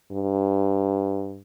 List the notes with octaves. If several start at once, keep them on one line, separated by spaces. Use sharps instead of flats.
G2